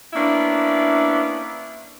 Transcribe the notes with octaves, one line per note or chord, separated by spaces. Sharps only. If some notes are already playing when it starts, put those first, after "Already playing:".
A#3 B3 C#4 D4 E4